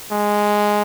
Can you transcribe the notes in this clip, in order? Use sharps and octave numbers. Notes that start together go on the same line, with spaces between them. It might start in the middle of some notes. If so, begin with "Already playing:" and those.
G#3